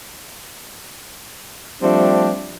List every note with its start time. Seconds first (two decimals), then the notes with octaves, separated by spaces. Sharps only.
1.81 F3 G3 A3 C4 D4